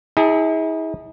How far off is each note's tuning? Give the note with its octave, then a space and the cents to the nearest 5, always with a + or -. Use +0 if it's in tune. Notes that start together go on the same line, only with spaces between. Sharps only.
E4 -45 G#4 -15 A5 +20